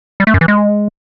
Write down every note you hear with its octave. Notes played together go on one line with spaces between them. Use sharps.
G3
A3
F#2
E3
G#3